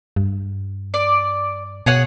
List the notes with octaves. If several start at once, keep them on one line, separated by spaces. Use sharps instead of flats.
G2
D5
B2 G#4 C#5 F#5